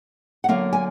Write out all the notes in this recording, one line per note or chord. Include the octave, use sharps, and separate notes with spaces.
F#5
D3 F#3 A#3 F5
G#5